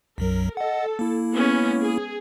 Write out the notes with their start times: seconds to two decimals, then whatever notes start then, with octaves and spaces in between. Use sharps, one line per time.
0.18 B1 F#2 F#3 A#4
0.57 A4 D#5 F#5
0.99 A#3 E4
1.33 G#3 B3 C#4
1.82 G#4